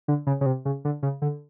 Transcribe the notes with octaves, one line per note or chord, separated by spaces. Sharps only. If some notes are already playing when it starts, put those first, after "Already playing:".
D3
C#3
C#3
C3
C#3
D3
C#3
D3